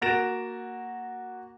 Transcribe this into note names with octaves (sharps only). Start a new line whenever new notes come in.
A#3 F#4 A6 A#6 D7 E7